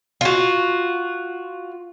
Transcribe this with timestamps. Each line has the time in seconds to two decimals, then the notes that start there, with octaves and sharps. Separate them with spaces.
0.21 F4 F#4